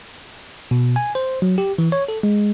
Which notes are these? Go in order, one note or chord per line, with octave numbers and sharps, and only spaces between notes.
B2
G#5
C5
F#3
G4
E3
C#5
A4
G#3